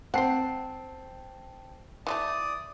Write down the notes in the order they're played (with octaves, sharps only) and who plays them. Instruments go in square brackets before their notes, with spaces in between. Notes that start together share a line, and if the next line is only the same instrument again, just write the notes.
[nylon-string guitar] C4 [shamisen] C5 F#5 [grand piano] G5 A5 C7
[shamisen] E3 G#3 A3 [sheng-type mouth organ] D5 D#6